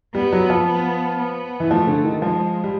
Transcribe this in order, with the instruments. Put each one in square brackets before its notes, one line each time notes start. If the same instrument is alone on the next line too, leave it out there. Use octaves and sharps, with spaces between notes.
[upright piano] G3 [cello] B3
[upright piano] F#3
F3
[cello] B3
B3
[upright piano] E3
[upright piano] F3 [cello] A3
[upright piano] D3
D#3
[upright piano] F3 [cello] G#3
[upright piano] G3